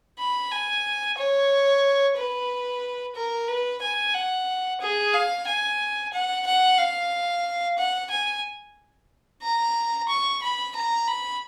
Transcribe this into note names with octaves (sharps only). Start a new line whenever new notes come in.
B5
G#5
C#5
B4
A#4
B4
G#5
F#5
G#4
F5
G#5
F#5
F#5
F5
F#5
G#5
A#5
C#6
B5
A#5
B5